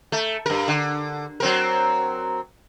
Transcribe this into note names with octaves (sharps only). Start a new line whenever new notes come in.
A3
G2 A#4
D3
F#3 C4 A#4